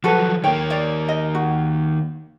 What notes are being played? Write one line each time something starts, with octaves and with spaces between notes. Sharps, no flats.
F3 F#3 F#4 A4 B4
D#3 A#3 C#5 G5
C#5 D5
D#5
F#4